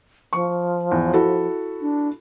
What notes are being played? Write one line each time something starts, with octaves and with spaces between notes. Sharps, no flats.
F3 C#6
E2
E4 F#4 A4
D4